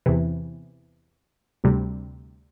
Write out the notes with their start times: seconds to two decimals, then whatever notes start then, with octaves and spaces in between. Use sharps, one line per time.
0.06 E2 C3 E3
1.64 D2 C3 G3